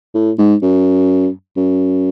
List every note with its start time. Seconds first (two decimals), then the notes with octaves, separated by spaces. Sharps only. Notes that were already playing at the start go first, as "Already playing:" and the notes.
0.15 A2
0.38 G#2
0.62 F#2
1.57 F#2